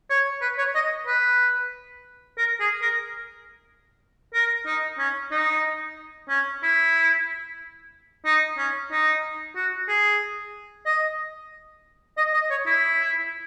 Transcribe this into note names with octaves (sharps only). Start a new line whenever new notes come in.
C#5
B4
C#5
D#5
B4
A#4
G#4
A#4
A#4
D#4
C#4
D#4
C#4
E4
D#4
C#4
D#4
F#4
G#4
D#5
D#5
D#5
C#5
E4